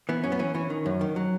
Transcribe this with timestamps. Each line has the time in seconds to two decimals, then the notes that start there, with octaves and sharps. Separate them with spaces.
0.09 E3 B3
0.24 F#2 C#4
0.32 B3
0.39 E3 C#4
0.54 E3 C#4
0.70 D#3
0.86 F#2
1.01 D#3
1.16 F#3